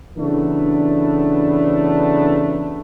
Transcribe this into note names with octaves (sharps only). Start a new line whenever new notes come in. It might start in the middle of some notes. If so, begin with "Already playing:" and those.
C#3 E3 F#3 A3 B3 D4